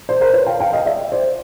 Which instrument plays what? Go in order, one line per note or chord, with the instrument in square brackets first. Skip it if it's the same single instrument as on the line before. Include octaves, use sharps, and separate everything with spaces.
[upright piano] C5 D5
A#4 C5
B4 C#5
F5 G5
F5 G5
D#5 F5
D5 E5
C5 D5